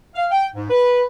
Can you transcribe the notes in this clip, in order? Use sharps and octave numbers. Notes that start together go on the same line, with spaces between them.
F5
G5
G#2
B4